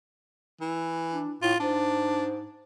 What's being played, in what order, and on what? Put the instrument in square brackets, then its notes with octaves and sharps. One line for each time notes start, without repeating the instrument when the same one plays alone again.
[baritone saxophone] E3
[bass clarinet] D4
[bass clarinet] A2 [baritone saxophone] F4
[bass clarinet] G#2 [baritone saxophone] D4